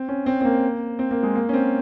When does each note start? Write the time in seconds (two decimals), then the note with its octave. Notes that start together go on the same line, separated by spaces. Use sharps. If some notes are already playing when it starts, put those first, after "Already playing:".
Already playing: C4
0.08 C#4
0.26 C4
0.41 C4
0.45 A#3
0.99 C4
1.11 A#3
1.23 G#3
1.35 A#3
1.49 C#4
1.53 C4